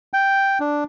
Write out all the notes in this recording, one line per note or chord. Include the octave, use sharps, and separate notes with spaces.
G5
D4